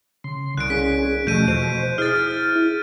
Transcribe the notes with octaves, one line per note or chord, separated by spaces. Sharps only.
C#3 C6
C2 F#6 D7
C#4 G#4 B6
E2 B2 F3 A3 G6 D#7
B2 C5
E4 G#4 F6 A6